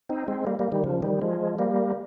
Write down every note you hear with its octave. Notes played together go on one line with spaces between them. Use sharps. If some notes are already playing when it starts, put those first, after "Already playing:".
C4 D#4
G#3 C4
G3 A#3
G3 A#3
D#3 G3
C#3 F3
D#3 G3
F3 G#3
G3 A#3